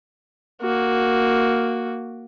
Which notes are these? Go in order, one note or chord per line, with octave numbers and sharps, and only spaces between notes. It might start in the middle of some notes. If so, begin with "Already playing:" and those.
A#3 F#4